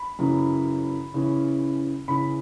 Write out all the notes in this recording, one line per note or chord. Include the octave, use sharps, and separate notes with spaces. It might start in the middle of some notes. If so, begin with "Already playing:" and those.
Already playing: B5
F#2 C#3 E3
C#3 E3 C#4
C#3 E3 C#4 B5